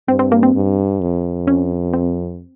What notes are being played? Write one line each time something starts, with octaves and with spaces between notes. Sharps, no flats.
G2 C4
C4
A#3
C4
G2
F2
C#4
C4